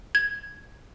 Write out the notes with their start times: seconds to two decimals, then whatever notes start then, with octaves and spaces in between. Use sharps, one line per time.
0.15 G#6